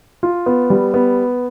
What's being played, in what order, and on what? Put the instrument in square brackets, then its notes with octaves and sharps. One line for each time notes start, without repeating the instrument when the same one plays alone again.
[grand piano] F4
B3
G3
B3